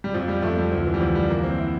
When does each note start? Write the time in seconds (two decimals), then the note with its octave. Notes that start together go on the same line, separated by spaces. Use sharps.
0.04 G3
0.14 F2 F3
0.28 G3
0.42 F2 A3
0.58 G3
0.72 D2 F3
0.86 E3
0.94 G3
1.01 D2 F3
1.15 G3
1.29 E3 A#3
1.43 C4
1.58 E4